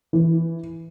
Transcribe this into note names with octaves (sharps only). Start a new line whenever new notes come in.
E3